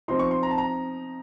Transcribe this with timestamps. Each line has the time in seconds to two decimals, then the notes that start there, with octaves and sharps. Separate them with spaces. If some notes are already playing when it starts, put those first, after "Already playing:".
0.08 F3 C4 D#4 C6
0.19 C#6
0.31 C6
0.43 A#5
0.51 A5
0.58 A#5